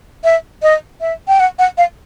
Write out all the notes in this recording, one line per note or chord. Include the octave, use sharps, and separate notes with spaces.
E5
D#5
E5
G5
F#5
F#5
F5